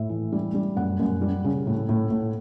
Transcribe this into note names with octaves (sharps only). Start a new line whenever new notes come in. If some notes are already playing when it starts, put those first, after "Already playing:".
Already playing: A2 E5
E3
G3
G3
F#2 F#5
F#2
G3
C#3
A2
A2
A2